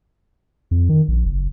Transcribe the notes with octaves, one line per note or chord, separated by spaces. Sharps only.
F2
D#3
A#1
F#1